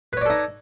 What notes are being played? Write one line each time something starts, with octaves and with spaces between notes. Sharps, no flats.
D#4 A4 B4 C#5 D5